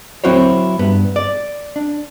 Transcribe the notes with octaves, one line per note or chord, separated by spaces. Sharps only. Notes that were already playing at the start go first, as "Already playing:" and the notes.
F#3 C4 E4 F#4 C5 C#5
G2 B3
D5
D4